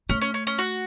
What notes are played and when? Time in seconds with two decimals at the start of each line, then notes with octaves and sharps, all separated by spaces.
0.09 A3 C#4
0.21 C#4
0.34 C#4
0.47 C#4
0.58 F#4